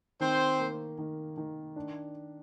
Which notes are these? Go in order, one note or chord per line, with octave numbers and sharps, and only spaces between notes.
D#3 C4 C5
A#3
D#3
D#3
D4